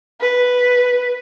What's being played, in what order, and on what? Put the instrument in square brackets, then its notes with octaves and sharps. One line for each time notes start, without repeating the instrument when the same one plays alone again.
[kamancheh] B4